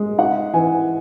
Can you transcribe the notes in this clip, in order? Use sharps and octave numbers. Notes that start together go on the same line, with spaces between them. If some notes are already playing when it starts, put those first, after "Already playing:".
Already playing: G#3
D#4 F#5
E3 G#5